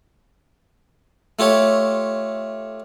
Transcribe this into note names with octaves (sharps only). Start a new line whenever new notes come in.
A3 F4 G4 C#5